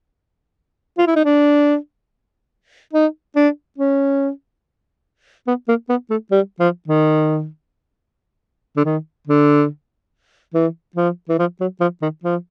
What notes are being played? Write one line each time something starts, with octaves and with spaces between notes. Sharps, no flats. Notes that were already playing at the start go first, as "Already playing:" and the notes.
F4
E4
D#4
D4
D#4
D4
C#4
B3
A#3
B3
A3
G3
F3
D#3
D3
D#3
D3
E3
F3
E3
F3
F#3
F3
D#3
F3